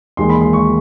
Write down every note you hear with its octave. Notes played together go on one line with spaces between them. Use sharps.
E1 D#2 D#3 G#3 C6
B5
C6
C#6